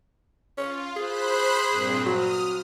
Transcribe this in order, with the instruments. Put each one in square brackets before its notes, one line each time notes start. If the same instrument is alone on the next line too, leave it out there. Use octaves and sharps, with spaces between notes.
[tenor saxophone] C#4 [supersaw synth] F4
[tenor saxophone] G#4 [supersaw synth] C5 B5 F#6
[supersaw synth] G2 A#2 C4
[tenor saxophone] F#3 [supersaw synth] D#6 F6